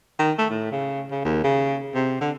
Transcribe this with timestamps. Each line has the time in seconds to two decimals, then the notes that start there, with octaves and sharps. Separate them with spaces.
0.19 D#3
0.38 A3
0.50 A2
0.72 C#3
1.11 C#3
1.25 D#2
1.44 C#3
1.95 C3
2.21 D3